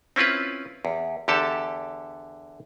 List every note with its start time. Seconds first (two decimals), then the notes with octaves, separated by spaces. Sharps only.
0.16 C4 C#4 E4 F4 B4
0.85 E2
1.28 E2 D3 G4 A4 A5